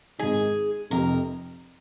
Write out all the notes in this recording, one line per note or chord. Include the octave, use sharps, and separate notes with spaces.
G#1 G#2 D#3 G#3 D#4 G#4
F1 F2 C3 A#4